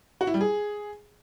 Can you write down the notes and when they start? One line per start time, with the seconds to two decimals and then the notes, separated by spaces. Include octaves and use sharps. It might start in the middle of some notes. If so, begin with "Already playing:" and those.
0.21 F#4
0.27 E4
0.34 G3
0.41 G#4